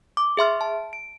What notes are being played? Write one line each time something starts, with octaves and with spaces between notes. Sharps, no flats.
D6
G#4 E5 C6 F6
A5
D7